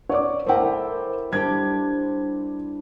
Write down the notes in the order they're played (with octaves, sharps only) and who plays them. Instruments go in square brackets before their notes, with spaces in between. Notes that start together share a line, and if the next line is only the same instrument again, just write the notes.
[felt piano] C#5 D5 D6
[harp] A3 E4 A#4 [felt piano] C5 G5
[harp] G3 D4 G4 [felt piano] C5 G#6